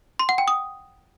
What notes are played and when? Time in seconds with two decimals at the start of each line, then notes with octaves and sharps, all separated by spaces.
0.19 C6
0.29 F#5
0.38 G5
0.48 D#6